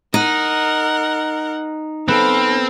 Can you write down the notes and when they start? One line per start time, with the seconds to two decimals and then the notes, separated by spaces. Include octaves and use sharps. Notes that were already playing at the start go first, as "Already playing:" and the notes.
0.14 D#4 A#4 F#5
2.08 B3 C4 A4 F5